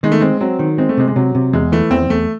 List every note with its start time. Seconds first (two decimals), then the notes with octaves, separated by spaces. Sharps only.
0.03 D#3 G#3
0.12 A3
0.21 G#3 C4
0.41 F#3 C4
0.59 D#3
0.78 G#3 C4
0.89 A3
0.97 C3 G#3
1.08 G#3
1.16 C3 F#3
1.35 C3
1.53 E2 G#3
1.72 E3 A3
1.91 E2 C4
2.10 E2 A3